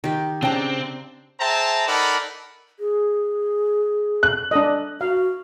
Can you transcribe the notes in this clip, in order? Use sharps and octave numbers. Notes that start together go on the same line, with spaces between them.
D#3 G4
C#3 C4 D4 G5 A#5
G#4 C5 E5 G5 A5 A#5
D#4 A4 A#4 D5 F#5 B5
G#4
F#6
D4 A4 D#5
F#4 F5